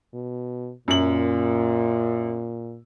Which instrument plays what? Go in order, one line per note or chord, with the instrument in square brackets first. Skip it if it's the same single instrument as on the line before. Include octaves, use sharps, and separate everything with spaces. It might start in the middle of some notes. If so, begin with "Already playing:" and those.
[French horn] B2
[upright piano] F#2 F#7 [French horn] A#2